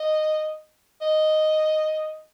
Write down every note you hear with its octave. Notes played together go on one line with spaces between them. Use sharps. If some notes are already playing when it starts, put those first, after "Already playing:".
Already playing: D#5
D#5